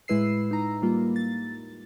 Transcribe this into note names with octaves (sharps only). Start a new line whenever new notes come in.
A2 G#3 E4 B4 E6 C7
D#4 A#5
G3 A#3 F4
A6